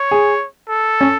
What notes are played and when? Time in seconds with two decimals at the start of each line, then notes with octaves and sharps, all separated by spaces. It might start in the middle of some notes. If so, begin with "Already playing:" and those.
Already playing: C#5
0.11 G#4
0.69 A4
1.01 C#4